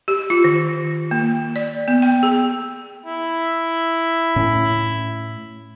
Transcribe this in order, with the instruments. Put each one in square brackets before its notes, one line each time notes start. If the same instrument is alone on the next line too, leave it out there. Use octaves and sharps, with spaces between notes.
[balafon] G4
F4
D#3
A#3
D5
B3
G5
G#4
[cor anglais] E4
[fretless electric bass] A2 C#4